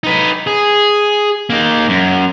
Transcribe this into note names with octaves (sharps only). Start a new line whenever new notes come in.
D#4 B4
G#4
A#3 D#4
F#2